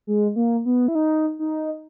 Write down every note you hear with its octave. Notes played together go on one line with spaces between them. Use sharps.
G#3
A#3
B3
E4
D#4
D#4